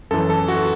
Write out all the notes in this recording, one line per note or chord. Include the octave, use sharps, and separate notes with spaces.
F#2 E3 A4
A4
F#4